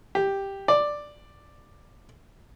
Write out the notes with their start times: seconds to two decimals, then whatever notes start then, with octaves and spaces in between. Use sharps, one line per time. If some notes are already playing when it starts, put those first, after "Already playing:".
0.15 G4
0.68 D5